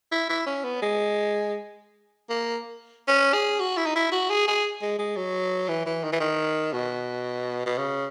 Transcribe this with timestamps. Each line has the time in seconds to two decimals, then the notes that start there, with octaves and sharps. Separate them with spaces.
0.12 E4
0.29 E4
0.46 C#4
0.64 B3
0.82 G#3
2.29 A#3
3.08 C#4
3.33 G#4
3.60 F#4
3.77 E4
3.86 D#4
3.95 E4
4.12 F#4
4.30 G#4
4.47 G#4
4.82 G#3
4.99 G#3
5.16 F#3
5.69 E3
5.86 E3
6.04 D#3
6.12 E3
6.20 D#3
6.73 B2
7.66 B2
7.78 C#3